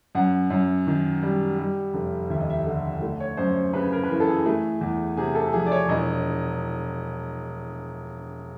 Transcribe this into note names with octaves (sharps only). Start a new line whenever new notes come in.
F#2 F#5
F#2
D#3
G3
G3
F1
D#2 E5
D#5
E5
D3
A3
C#5
F#2 C5
C5
C#3 B4
A#4
B4
E3 A#4
A4
G#4
A3
E2
C3 G#4
A4
F3 G#4
D5
C#5
E1 D#5